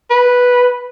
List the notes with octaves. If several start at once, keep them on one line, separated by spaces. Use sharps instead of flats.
B4